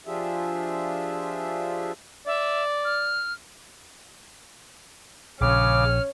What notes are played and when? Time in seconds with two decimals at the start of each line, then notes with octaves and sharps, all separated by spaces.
0.06 F3 D4 F4 G4 G#4 E5
2.27 D5 E5
2.85 F6
5.41 A#1 C#3 C#4 D6 F6